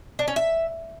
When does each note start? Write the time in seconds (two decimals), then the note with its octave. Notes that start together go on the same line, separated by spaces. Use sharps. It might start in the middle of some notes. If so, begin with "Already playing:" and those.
0.19 D4
0.28 C#4
0.36 E5